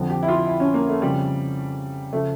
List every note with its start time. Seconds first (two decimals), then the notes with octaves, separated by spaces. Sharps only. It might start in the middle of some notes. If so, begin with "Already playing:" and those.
Already playing: F2 D3 F3
0.10 G4
0.23 E4
0.28 F4
0.47 E4
0.60 C#4
0.74 A#3
0.89 A3
1.02 F2 C#3 F3 G3
2.13 C#3 F3 A3